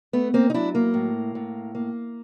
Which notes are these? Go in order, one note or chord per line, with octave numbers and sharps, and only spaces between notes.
A3 B3
A#3 C4
D#4
F#3 D4 E4
A#3
A2
A2
A#3